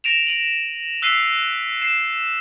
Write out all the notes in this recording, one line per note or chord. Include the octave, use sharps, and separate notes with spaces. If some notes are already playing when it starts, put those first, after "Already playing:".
A#6 D7 E7 F7
D7 D#7 F#7
E6 F#6 B6 C7 D#7
C7 E7